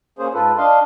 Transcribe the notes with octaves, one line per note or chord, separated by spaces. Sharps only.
A#3 C#4 G#4 C5
G#2 F4 A4 B4
D4 D#5 F5 C6